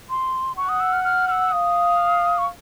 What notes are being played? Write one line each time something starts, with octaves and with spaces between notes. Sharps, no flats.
C6
F#5 C#6
D#6
E6
F6
F6
F6
E6
F5 D#6
C#6